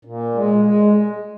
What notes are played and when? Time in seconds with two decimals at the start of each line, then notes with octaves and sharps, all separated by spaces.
0.05 A#2
0.35 G#3
0.65 G#3